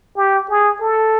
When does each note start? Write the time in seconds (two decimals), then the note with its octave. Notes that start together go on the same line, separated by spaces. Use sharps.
0.17 G4
0.50 G#4
0.81 A4